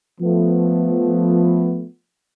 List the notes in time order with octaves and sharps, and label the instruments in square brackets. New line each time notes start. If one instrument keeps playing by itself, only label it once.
[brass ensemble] F3 A3 B3